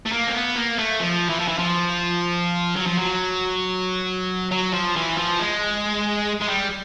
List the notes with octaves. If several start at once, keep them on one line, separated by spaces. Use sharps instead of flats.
A3
A#3
C4
B3
A#3
A3
F3
E3
F3
E3
F3
F#3
F3
F#3
F#3
F3
E3
F3
G#3
G#3
G3